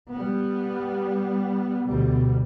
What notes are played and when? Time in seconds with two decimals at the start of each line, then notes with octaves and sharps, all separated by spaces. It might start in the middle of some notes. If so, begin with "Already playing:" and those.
0.11 G3 B3
1.87 D2 B2 G3